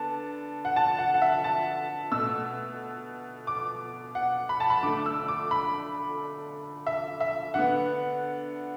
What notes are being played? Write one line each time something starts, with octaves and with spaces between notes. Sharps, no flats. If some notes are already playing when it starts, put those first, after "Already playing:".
Already playing: D3 B3 A5
F#5
A5
F#5
F#5
E5
A5
B2 A3 E6
D6
F#5
B5
A5
B5
D3 A3 D6
E6
D6
B5
E5
E5
D3 B3 F#5